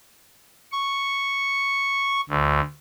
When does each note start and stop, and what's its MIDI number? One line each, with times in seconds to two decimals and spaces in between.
0.72 2.21 85
2.29 2.60 38